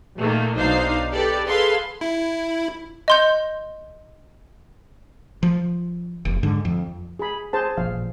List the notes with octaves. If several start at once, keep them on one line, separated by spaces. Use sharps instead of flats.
A#2 D#3 A3 A#3
B1 D4 D#4 C5 F5 C7
G4 A4 B4 D5
G#4 A4 B4 F5 C6
E4
D#5 C6 G6
F3
F1
G#2 D3
F2
G#4 B5
G#4 C5 A5
A1 A#2 F3 F5